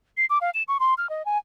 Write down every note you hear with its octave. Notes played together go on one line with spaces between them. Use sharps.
C7
D6
F5
E7
C#6
C6
F6
D#5
G#5